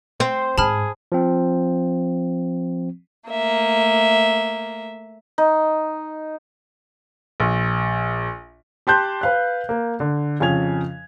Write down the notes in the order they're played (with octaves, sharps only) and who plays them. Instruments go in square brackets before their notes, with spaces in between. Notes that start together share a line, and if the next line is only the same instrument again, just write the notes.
[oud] C4 [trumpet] C5
[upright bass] G#2 [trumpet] G#4 [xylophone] A5 B5 F6
[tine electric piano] F3 C4
[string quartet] A3 A#3 E5
[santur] D#4
[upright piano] A#1
G4 G5 A5 C6 F#6 G6
B4 F5 F#6
A#3
D3
F2 C#3 G#5 G#6 F7